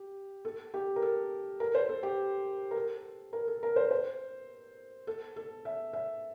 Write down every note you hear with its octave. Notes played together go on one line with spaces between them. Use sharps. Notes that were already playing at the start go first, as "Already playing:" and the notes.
Already playing: G4
A4
G4
A#4
A4
A#4
C5
A4
G4
A#4
A4
A#4
A4
A#4
C5
C5
A4
A4
E5
E5